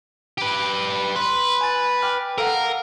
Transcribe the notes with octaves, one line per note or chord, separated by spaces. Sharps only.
G4 B4
B4 C6
G#5 A6
G5 D6 F6
A4 A#4 F5 F#5